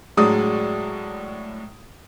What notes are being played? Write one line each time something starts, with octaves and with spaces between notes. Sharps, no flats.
A2 F#3 G#3 D4 D5 D#6